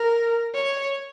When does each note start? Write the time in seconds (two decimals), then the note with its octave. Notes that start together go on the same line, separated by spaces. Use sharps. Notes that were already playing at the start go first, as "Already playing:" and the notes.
Already playing: A#4
0.55 C#5